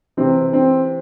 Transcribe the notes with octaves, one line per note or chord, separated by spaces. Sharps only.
C3 E3 C4
C4